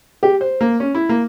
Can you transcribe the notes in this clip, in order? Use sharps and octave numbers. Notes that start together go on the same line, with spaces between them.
G4
C5
A#3
C#4
E4
A#3